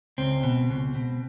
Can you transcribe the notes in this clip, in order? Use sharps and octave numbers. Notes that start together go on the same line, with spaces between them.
C#2 C4
B2
C#2
B2